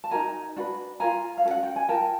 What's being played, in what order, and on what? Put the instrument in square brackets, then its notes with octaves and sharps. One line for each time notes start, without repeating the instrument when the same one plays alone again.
[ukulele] A5
D#4 F#4 A#4 G#5 A#5
D4 F#4 B4
F4 A#4 G#5 A#5
F5
C#4 F#4 A4
F#5
G5
G#5
F4 A#4 G5 A5